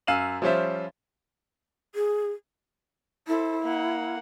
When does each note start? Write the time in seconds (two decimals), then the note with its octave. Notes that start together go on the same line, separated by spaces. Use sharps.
0.07 F#2 F5 E6 D#7 E7 F#7
0.42 F3 G3 C#4 F4 C5 E5
1.95 G#4
3.28 E4 A4 C5
3.62 A#3 F#5